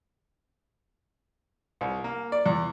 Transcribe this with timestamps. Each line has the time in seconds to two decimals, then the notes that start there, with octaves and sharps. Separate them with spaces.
1.81 C2
2.04 A#3
2.32 D5
2.46 E2